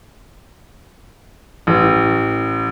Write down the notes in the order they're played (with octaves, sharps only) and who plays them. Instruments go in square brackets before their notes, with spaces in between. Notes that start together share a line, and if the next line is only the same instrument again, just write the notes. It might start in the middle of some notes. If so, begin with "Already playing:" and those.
[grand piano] A1